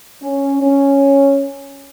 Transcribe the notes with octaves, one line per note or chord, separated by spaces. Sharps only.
C#4
C#4